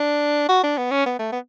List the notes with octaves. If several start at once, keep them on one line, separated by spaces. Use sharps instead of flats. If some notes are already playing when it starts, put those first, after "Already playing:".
Already playing: D4
F#4
D4
B3
C#4
B3
A3
B3